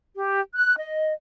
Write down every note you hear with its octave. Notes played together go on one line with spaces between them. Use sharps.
G4
F#6
D#5